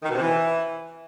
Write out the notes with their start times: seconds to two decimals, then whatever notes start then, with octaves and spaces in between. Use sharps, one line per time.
0.03 D#3
0.09 B2
0.15 C3
0.21 E3